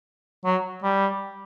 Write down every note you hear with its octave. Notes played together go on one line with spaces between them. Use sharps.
F#3
G3